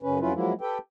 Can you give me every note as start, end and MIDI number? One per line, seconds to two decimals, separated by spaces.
0.03 0.20 42
0.03 0.20 49
0.03 0.20 61
0.03 0.20 71
0.20 0.33 41
0.20 0.33 54
0.20 0.33 61
0.20 0.33 64
0.20 0.33 65
0.20 0.33 71
0.34 0.53 53
0.34 0.53 54
0.34 0.53 56
0.34 0.53 58
0.34 0.53 64
0.61 0.78 67
0.61 0.78 69
0.61 0.78 71
0.61 0.78 79